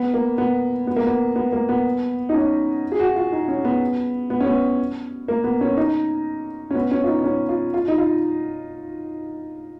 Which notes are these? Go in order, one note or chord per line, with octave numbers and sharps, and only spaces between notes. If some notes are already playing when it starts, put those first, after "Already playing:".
Already playing: B3
A#3
B3
B3
A#3
B3
B3
A#3
B3
D#4
C#4
G#4
F#4
F4
D#4
C#4
B3
B3
C#4
B3
A#3
B3
C#4
D#4
C#4
B3
C#4
F4
D#4
C#4
F4
F4
D#4
F4